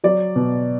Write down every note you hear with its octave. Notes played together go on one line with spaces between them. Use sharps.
F#3 D5
B2